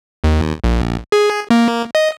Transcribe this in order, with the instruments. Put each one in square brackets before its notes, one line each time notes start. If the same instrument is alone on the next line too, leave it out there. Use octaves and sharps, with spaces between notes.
[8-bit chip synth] D#2
A#1
G#4
A#3
D#5